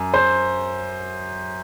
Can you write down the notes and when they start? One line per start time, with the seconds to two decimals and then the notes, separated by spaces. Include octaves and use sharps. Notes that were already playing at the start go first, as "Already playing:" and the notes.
Already playing: F#2
0.14 C5